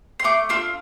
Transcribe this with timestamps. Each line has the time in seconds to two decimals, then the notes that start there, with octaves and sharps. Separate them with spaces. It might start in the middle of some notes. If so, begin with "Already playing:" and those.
0.19 C6
0.24 A3 D6
0.49 D4 F4 E6